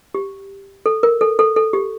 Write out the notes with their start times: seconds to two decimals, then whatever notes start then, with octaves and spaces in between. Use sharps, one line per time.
0.15 G4
0.86 A4
1.03 A#4
1.21 A4
1.39 A4
1.56 A4
1.73 G4